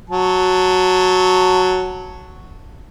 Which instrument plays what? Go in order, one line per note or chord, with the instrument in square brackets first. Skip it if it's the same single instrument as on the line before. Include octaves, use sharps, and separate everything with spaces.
[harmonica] F#3 A5